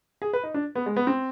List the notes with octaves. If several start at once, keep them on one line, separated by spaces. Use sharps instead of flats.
G#4
B4
D#4
D4
B3
G#3
B3
C4